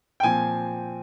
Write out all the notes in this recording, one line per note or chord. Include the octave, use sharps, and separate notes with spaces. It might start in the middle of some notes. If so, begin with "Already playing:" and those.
G5
A#2 F3 C4 G#5